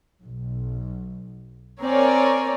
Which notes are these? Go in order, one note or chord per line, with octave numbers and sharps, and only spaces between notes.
B1
C4 A#4 C#5 D5 G#5